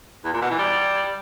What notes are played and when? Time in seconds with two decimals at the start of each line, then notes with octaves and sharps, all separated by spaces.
0.25 E2
0.33 A#2
0.42 B2
0.50 E3
0.59 G3